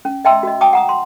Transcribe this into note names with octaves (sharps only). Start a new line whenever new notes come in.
C#4
D#5 E5 G5 A5 C6 E6
F#4 D#5
G5 A5 D6 D#6
F#5 A#5 D#6
C6